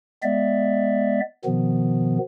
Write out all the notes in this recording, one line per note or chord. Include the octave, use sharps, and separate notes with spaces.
G#3 B3 D5 E5
B2 D#3 F3 B3